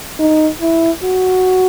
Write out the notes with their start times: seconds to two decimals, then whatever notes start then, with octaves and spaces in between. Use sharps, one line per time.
0.19 D#4
0.62 E4
1.04 F#4